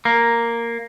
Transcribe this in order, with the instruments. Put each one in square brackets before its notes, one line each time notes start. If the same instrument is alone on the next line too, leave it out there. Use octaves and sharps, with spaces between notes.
[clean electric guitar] A#3